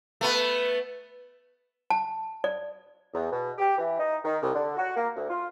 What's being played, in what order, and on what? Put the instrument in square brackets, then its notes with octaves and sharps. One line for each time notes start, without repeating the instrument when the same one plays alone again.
[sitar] A3 B3 B4
[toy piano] A5
D5
[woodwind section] E2
B2
G4
E3
D#4
D#3
C2
D3
F#4
A#3
D2
F4